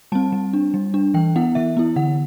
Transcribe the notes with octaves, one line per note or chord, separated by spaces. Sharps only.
G3 C4 A5
G3
D4
G3
D4
E3 G5
B3 E4 F#5
E3 E5
B3 E4
D3 F#5